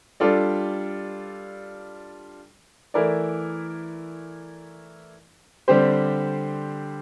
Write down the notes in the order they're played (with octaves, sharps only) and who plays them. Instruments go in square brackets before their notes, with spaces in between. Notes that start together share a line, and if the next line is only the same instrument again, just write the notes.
[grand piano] G3 D4 F4 A4 D5
E3 A3 E4 A#4 D5
D3 G3 C4 G4 C5